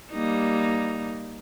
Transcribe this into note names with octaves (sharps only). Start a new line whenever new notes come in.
G3 A#3 D#4